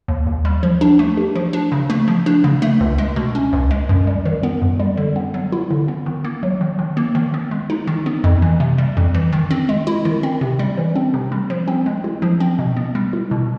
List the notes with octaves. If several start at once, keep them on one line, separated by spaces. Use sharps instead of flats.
D#2
D#2
G3
F3
D4
A3
G4
F3
D4
C#3
A3
F3
D4
C#3
A3
C#2
G#3
B2
C#4
C#2
G#3
F#2
G3
D#3
B3
F#2
G3
D3
B3
F#3
E4
D3
B3
D#3
A#3
F#3
D#3
D#3
A#3
D#3
B3
G#3
D#4
D#3
B3
F2
E3
C3
G3
F2
E3
D#3
C4
G#3
E4
D#3
C4
C3
G3
E3
C4
C3
G3
F3
C4
G#3
E4
F3
C4
B2
B3
G3
E4
B2